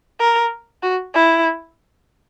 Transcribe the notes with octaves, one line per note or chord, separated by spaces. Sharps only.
A#4
F#4
E4